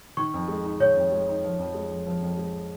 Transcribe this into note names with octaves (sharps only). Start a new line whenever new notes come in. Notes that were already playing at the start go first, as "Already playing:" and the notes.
D#3 C#6
F2
G#3
D#4
D#3 C#5
F2
G#3
D#4
F3
F2
G#3
F2
F3
F2
G#3